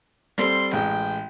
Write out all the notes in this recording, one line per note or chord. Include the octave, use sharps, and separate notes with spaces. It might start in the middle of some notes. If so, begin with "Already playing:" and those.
G3 C4 A4 C6
A1 G#3 G5